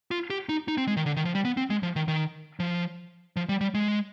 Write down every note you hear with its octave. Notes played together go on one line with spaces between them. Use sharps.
F4
G4
D#4
D#4
C4
G#3
D#3
D3
D#3
F3
G3
B3
C4
G#3
F3
D#3
D#3
F3
F3
G3
G3
G#3